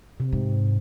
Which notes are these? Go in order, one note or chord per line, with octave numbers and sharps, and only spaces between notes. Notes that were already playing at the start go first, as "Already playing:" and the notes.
C3
G#2